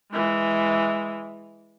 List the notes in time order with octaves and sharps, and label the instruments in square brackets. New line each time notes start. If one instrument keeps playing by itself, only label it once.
[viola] E3 G#3